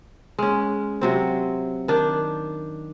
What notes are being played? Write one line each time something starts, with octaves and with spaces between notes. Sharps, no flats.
G#3 C#4
C3 F#3 C4
D#3 D4